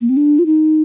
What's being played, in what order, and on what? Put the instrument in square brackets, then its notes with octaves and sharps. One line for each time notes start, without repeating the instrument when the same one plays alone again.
[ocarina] A#3
C4
D4
F4
D#4